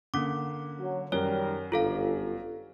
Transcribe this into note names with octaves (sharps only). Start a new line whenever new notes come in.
D3 A#3 C#4 D6
F#3
F#2 D#3 G3 A#4 C#5
G1 F4 A4 F5